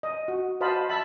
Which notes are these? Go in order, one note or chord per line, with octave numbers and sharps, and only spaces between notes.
D#5
F#4
F#4 C5 D#5 F5 A5 B5
E5 A5 B5